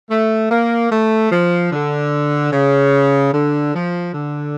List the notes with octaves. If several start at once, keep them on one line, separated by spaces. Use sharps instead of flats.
A3
A#3
A3
F3
D3
C#3
D3
F3
D3